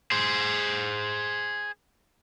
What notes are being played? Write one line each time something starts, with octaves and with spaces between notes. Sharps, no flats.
G#4 C5